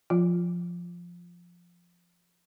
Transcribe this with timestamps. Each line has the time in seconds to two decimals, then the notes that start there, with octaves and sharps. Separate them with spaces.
0.10 F3 F4